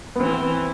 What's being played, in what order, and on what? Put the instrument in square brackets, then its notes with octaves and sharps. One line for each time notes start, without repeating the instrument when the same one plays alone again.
[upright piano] B3
[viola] E3 [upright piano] C4